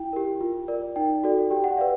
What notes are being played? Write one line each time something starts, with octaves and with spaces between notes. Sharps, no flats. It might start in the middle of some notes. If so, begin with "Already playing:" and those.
Already playing: E4 G5
G4 A#4
F4
A#4 D5
D#4 G5
F#4 A4 D5
G4 G5
F#5
B4 D5 F5